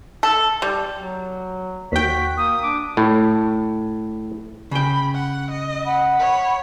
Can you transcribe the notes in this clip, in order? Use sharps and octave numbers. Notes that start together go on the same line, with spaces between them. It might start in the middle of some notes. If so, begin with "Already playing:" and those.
A4
G3
F#3
D#2 F#4 G5 B6
A#3 D#6
D4 D6
A2
C#3 G5 B5
F#5
D#5
F#5 B5
C#5